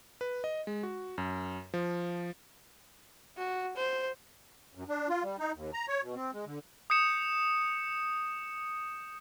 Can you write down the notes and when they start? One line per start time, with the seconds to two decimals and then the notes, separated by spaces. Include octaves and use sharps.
0.21 B4
0.44 D#5
0.67 G#3
0.83 F#4
1.18 F#2
1.74 F3
3.38 F#4
3.77 C5
4.75 F#2
4.88 D4
5.09 F4
5.23 G3
5.39 D#4
5.55 D#2
5.74 A#5
5.88 C#5
6.02 B2
6.15 C4
6.34 G#3
6.46 D3
6.90 D#6 G6 C#7 E7